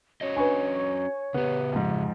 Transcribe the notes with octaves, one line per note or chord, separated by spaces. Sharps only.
C#4 F#4 C#5 D#5
D4 B4 G#5 C#6
C#3 B3 G4
F2 G#2